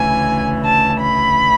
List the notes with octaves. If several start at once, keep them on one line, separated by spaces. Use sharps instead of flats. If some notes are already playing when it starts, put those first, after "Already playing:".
Already playing: D2 C#3 E3 G#5
A5
B5